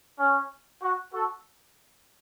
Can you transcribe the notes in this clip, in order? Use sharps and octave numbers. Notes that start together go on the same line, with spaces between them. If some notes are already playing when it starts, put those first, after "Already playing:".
C#4
F#4
F#4 A4